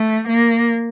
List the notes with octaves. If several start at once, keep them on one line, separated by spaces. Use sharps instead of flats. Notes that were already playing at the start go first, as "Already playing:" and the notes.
Already playing: A3
A#3